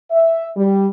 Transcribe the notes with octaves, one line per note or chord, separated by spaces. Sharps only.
E5
G3